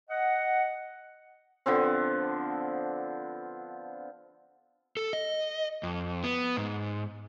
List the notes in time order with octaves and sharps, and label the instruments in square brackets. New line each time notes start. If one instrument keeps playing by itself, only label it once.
[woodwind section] D#5 F#5
[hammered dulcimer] D3 F3 B3 C4
[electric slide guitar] A4
D#5
F2
B3
G#2